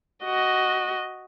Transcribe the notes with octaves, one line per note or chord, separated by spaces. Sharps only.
F#4 D#5